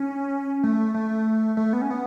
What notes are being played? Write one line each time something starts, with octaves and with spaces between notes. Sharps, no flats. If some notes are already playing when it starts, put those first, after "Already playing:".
Already playing: C#4
A3
A3
A3
B3
C#4
B3